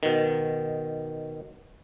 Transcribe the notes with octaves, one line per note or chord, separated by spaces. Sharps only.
B2 D#3